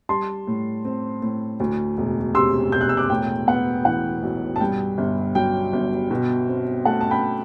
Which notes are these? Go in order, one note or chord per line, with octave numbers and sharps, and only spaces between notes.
G3 A5 C6
A2
C4
A2
D2
E1
C3 C6 E6
E1 G6
F#6
E6
D6 F#6
A2 G5
B3 F#5
E3 F#5
B1
A5
G2 G5
G1
F#3 G5
G1
B2
C4
A3 F#5 A5
A5
G5 B5